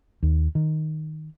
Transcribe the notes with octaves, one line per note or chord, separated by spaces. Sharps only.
D#2
D#3